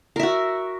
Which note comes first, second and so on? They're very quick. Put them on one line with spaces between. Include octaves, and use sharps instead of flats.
A#4 E5 F#4